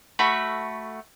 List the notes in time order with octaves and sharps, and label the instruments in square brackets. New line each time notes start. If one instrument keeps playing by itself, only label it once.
[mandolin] A3 F#4 B5